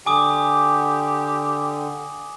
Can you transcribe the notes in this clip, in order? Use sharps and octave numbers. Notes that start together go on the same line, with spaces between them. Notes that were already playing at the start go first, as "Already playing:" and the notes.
D3 G4 G#5 D6 D#6